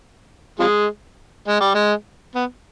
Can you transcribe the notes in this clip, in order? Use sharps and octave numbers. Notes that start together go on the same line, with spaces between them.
C3 F3 G#3
G#3
G3
G#3
B3